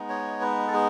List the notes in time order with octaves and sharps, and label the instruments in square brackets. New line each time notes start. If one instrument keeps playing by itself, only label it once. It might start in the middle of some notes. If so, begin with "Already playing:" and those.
Already playing: [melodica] G#3 B3 D#4
C#5
B4
A4
G#4